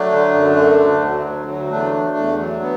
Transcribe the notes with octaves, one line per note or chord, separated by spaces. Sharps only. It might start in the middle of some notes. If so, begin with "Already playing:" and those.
Already playing: F#3 A3 D4
D3
F#2
D3
D2
F#3
D2
F#3
E2 A3 D4
E2
E2
F#3
B3